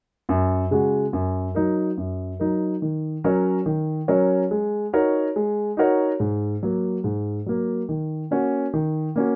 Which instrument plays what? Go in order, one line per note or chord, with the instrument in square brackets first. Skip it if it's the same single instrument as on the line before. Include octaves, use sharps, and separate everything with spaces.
[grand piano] F#2
C#3 G#3 F#4
F#2
F#3 D#4 A#4
F#2
F#3 D#4 A#4
D#3
F#3 C#4 A#4 C#5
D#3
F#3 C#4 A#4 C#5
G#3
D#4 F#4 A#4 C#5
G#3
D#4 F#4 A#4 C#5
G#2
F#3 A#3
G#2
F#3 A#3
D#3
A#3 C#4 F#4
D#3
A#3 C#4 F#4